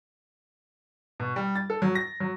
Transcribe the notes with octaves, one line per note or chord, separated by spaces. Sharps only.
B2
G3
A6
A4
F#3
A#6
F#3